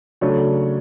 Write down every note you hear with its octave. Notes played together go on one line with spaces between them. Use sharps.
C#3 F#3 A3 D4 C#5